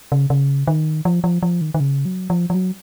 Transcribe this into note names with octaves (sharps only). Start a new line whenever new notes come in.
C#3
C#3
D#3
F3
F3
F3
D#3
D#3
C#3
F#3
F3
F3
F#3